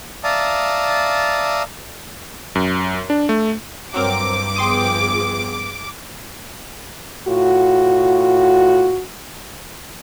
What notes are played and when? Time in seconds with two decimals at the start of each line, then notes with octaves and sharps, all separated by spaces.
0.24 D5 E5 F5 A5 A#5 D#6
2.55 F#2
3.10 D4
3.29 A3
3.94 G2 F#3 C4 A#4 D6
4.56 F3 B3 G#4 G5 C6 D#6
7.27 A2 F4 F#4